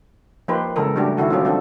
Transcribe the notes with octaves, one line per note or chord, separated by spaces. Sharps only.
F3 A#3 D#4 G4 B4 C5
C#3 E3 G#3 A4 A#4
G3 A3 D4 F#4 G4
D#3 E4 F#4 A4
E3 F#3 C4 C#4 F4 G4
C4 D4 F#4 A4